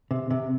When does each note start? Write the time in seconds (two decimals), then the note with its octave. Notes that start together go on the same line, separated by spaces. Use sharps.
0.11 C3
0.30 C3